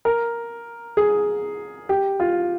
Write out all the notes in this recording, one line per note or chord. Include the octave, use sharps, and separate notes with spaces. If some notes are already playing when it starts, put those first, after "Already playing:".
A#4
G#4
G4
F4